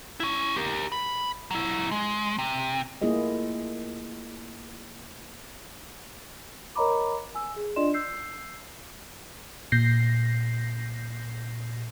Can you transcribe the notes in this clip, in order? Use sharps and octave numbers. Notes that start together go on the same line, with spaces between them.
C#4 E4
G4 A#4
B5
F#3 E4
G#3
C3
A3 A#3 E4 F4 G#4 D#5
A#4 C#5 D#5 A#5 B5 D6
G#5 E6
G#4
D4 F4 D5 D#5 C6 E7
E6 G6 C7
A#2 G6 A#6 C7